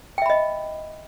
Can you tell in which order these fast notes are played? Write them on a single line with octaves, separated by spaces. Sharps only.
G5 E5 B5 D#5